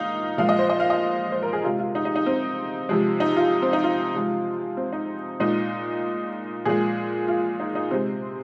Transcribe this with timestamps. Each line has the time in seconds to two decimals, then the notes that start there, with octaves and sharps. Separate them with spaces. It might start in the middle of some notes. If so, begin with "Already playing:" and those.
Already playing: A#2 G#3 D#4 D#5 F5
0.38 A#2 F3 G#3 F5
0.49 D#5
0.59 C5
0.69 D#5
0.80 F5
0.90 D#5
1.32 C5
1.43 A#4
1.53 G#4
1.64 C3 G#3 F4
1.79 F4
1.95 D#4
2.05 D#4
2.16 D#4
2.26 C4
2.89 C3 F3 G#3
3.20 D#4
3.37 F4
3.62 C4
3.73 D#4
3.84 F4
4.14 C3 F3 G#3
4.77 C4
4.93 D#4
5.40 A#2 G#3 D#4
6.65 A#2 F3 G#3 G#4
7.28 F4
7.60 D#4
7.75 D#4
7.91 C3 G#3 C4